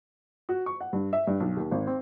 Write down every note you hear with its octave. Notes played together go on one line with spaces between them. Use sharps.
F#4
C#6
F#5
G2
E5
G2
B1
D#2
G#1
C4